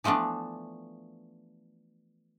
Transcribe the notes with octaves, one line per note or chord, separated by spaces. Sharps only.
E3 F3 A3 B3 D4